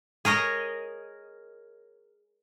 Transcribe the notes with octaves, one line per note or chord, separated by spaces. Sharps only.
G#4 A#4 C#5 D#5